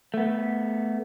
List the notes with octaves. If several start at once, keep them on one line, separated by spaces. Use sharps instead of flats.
A3 B3